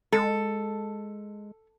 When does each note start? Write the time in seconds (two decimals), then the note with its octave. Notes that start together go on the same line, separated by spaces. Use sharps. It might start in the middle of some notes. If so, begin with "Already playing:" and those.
0.12 G#3 A4